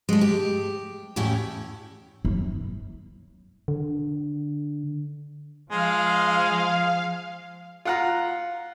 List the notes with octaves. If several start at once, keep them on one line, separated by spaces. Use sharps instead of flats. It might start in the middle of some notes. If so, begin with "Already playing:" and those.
G#3 A3
G4
E2 A2 C#4 E4 G5
F#2
D3
F3 G#3 F5
F4 F#5 A#5